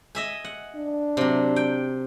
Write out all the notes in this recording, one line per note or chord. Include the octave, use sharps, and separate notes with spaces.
D#5 E5 G#5
F#5
D4
C3 F#3
G5